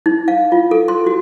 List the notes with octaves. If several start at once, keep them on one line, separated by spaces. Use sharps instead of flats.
D#4
F5
F4
A4
C6
F#4